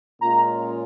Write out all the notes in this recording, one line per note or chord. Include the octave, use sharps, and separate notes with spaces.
A#2 G#3 C#4 F4 A#5